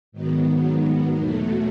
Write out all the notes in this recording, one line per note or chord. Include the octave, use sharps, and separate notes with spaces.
G#2 D#3 F#3 B3
E2 B2 F#3 A3